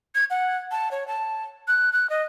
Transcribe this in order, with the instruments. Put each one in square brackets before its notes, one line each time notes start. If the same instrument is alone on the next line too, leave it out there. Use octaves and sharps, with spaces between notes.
[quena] G#6
F#5
A5
C#5
A5
F#6
F#6
D#5